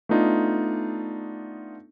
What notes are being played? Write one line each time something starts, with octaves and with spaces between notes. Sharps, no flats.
A3 B3 D4 D#4 F4